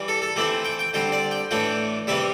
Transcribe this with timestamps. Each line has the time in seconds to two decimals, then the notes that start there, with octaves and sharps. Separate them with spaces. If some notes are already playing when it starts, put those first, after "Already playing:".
Already playing: E3 G3
0.08 A4
0.22 A4
0.36 E3 A3 C4 E4 G4
0.65 G5
0.79 G5
0.94 D3 G3 C4 G5
1.12 D5
1.31 G5
1.51 A2 E3 A3 D4 G5
2.07 C3 E3 G3 E5